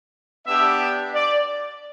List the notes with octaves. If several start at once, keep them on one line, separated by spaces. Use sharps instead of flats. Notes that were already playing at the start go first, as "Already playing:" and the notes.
B3 D4 G4 E5
D5